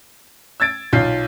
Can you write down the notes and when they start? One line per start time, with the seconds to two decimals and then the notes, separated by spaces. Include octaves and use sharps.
0.60 E6 G#6 A6 D7
0.93 B1 F4 G6 C7